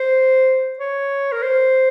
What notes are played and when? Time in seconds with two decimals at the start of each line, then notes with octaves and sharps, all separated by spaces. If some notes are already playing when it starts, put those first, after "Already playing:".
Already playing: C5
0.79 C#5
1.32 A#4
1.43 C5